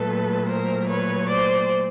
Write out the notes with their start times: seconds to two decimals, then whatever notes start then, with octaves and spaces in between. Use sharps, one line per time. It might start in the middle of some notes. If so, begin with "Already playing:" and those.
Already playing: A#2 F#3 A3 A4 B4
0.48 A#4 C5
0.88 B4 C#5
1.29 C5 D5